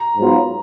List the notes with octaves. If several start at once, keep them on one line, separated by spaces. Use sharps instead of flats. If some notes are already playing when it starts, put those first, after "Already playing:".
Already playing: A#5
G#2 F#3 B3 F4